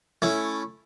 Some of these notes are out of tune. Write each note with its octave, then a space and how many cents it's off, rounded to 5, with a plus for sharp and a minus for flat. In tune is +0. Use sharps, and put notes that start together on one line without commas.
A3 -5 C#4 +0 E4 +0